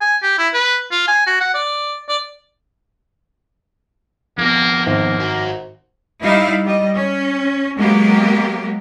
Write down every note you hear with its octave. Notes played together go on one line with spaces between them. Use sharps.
G#5
G4
E4
B4
F4
G#5
F#4
F#5
D5
D5
F2 A#3 B3
G#1 A#3
F#4 A#4
G3 D#4 E4 F5
G3 D#5
C#4
F#3 G#3 A#3 B3 G4